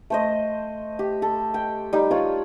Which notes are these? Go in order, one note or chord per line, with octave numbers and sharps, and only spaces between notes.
A3 C5 D#5
G4
A4
G5
G3 D#4 G4
F4 C#5 D5 D#6